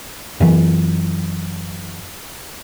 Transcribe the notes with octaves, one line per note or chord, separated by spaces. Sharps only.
F#2 E3